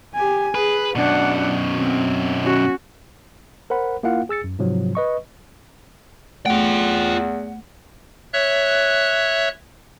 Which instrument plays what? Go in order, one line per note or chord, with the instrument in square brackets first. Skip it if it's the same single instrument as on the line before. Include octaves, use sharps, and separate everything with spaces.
[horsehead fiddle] G4 G#5
[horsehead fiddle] G#4 [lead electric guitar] B4
[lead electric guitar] F#2 B2 [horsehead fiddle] D4 F#5
[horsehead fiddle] C4
C#4 F#4
[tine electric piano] A#4 C5 F#5 B5
A#3 E4 F4 F5 F#5
G#4 E6 A6 C#7
F#2
G#2 C3 F3 F#3
B4 D#5 C#6
[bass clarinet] E2 [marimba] A3 [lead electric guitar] F4 G5 [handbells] F#5
[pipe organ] C#5 E5 F#6